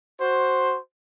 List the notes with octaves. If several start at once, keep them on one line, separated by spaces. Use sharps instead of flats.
F#4 C5